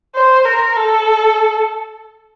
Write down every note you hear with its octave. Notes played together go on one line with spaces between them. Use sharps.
C5
A#4
A4